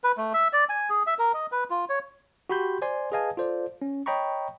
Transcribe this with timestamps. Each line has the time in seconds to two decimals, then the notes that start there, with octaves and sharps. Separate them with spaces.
0.04 B4
0.17 A3
0.33 E5
0.53 D5
0.69 G#5
0.90 G#4
1.07 E5
1.19 A#4
1.34 D#5
1.52 B4
1.70 F4
1.89 C#5
2.49 F#4 G4 B5 C6 G6
2.82 C5 D5 G#5 C6
3.12 G#4 B4 D#5 F5 G#5 A5
3.37 F4 A4 C5 D5
3.82 C#4
4.06 C#5 D#5 G5 A#5 B5 C#6